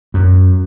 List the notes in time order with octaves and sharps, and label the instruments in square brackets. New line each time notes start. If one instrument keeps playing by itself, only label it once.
[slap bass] F#2